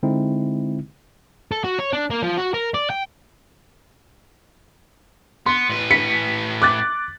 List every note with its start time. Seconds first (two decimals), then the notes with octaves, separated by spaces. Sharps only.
0.03 D3 G#3 C4 D#4 E4
1.52 A4
1.64 F#4
1.79 C#5
1.93 D4
2.10 A#3
2.23 F3
2.38 F#4
2.54 A#4
2.74 D5
2.90 G5
5.46 B3 C6
5.70 A2 B4
5.91 B6 C#7
6.62 D6 F#6 A6